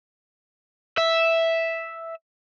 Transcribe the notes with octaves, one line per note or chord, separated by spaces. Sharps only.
E5